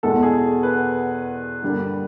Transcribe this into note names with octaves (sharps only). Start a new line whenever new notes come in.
E2 B2 G#3 A4
G#4
B4
G2 D3 G3 A#3